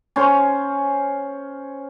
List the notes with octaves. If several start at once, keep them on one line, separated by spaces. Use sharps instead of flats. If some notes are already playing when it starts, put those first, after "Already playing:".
C#4 C5